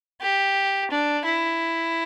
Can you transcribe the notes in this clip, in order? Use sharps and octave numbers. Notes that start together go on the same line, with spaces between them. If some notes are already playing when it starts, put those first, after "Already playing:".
G4
D4
E4